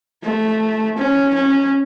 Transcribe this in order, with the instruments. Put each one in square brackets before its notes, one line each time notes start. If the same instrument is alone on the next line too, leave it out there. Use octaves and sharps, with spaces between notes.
[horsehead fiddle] A3
C#4
C#4